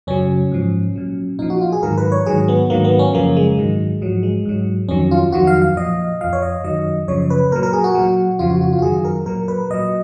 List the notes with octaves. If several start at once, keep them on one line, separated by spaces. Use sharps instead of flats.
F#2 C#3 F#3 C#4
G#2 F3
A#2 F#3
A#2 F3 D#4
F#4
F4
G#4
G#2 D#3 F#3 A#4
B4
C#5
G#2 D#3 F#3 G#4
B3
G#2 D#3 F#3 A#3
B3
C#4
F#2 C#3 F3 A#3
G#3
G#2 D#3 F#3
G#2 F3 F#3
G#3
G#2 F#3
F2 D#3 F#3 C#4
F4
F2 D#3 F#3 F#4
F5
F5
A#2 F3 D#5
F2 F3 F5
C#5
D#5
F#2 D#3 F#3 D#5
F#2 C#3 F3 C#5
B4
A#2 F#3 A#4
A#4
G#4
F#4
A#2 F#3
F2 C#3 F3 F4
F#4
F#4
F4
F#4
F#2 D#3 F#3 G#4
A#4
A#2 F#3 A#4
B4
A#2 F#3 D#5